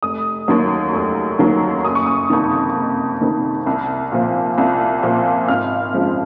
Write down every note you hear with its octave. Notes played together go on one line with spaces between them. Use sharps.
F1 D#6
D#2 D#3 F#3
F1
D#2 D#3 F#3
F#1 D#6
C#6
D#6
F2 C3 D#3
F#1
F2 C3 D#3
C2
A#2 F3
C2
A#2 F3
G#1 F6
F#2 F3 G#3